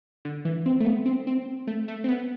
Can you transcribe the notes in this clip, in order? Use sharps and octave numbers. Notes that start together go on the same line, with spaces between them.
D3
E3
C4
A3
B3
C4
C4
A3
A3
C4
B3